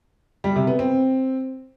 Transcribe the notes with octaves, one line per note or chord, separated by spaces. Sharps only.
G3
C3
B3
C4